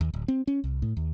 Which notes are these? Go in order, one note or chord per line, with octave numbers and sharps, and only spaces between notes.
D#2
D1
C4
C#4
C2
A2
D#2